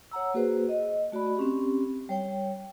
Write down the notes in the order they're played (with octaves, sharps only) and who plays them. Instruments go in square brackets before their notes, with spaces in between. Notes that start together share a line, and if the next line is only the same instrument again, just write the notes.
[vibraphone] C#5 F#5 A#5 E6
A#3 F#4 G#4 B4 C5
D#5
A3 F#4 D5 B5
C4 C#4 G4
G3 C#5 G5